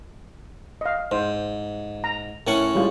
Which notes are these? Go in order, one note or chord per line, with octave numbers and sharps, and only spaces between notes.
D#5 F5
G#2 C5
A#5
A2 C#4 A#4 F#5
G3 G#3 F4